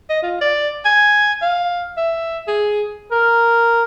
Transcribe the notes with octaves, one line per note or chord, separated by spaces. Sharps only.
D#5
F4
D5
G#5
F5
E5
G#4
A#4